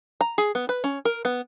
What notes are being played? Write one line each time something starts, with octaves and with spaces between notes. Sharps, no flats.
A#5
G#4
B3
B4
C#4
A#4
B3